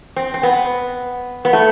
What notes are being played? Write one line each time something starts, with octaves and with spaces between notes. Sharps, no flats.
C4
C4
B3
B3
A3